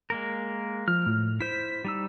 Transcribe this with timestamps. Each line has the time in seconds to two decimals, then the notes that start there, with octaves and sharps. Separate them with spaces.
0.10 G#3 A#3 A#4
0.88 F3 F6
1.06 A2
1.40 E4 C5 B6
1.85 G3 D#4 E6